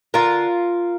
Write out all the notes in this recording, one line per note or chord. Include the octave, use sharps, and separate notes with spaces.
D3 F4 A#4